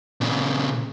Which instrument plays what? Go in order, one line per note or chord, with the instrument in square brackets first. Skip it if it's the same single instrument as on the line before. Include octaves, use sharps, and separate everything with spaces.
[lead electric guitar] A#2 C#3